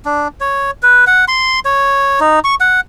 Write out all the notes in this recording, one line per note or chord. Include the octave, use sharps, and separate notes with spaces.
D4
C#5
B4
F#5
C6
C#5
D#4
C#6
F#5